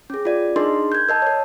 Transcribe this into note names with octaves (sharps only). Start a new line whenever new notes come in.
C#4 G#4
F4 D5
D4 D#4 G#4 A#4 D#5 C6
G6 G#6
A#4 D#5 A5
A#4 C#5